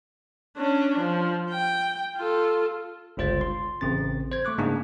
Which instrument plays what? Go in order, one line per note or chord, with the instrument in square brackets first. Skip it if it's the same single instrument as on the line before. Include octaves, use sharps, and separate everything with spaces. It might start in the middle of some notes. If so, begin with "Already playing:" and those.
[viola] C#4 D4
F3
G5
F4 A4
[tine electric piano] G1 C#2 F4 C5 A6
C6
A1 C#3 C4 A6
C5 G#6
A3 C#6 D6 F#6
G#2 C#3 A#3 D4 D#4 G#4